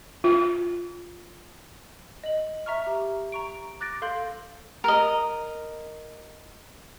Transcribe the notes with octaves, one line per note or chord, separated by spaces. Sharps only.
F4
D#5 F#7
E5 A#5 C#6 F6
G4 A#5
A#5 C#6 D7
D6 F#6 A6 A#6 D7
A4 F5 C6 G6 F#7
A#4 D#5